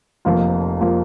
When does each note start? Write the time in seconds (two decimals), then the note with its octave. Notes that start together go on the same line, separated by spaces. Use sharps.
0.25 F1 F2 F3 A#3 F4
0.80 F3 A#3 F4